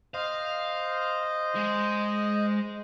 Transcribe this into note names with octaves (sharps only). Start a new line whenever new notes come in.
C5 D#5 F5
G#3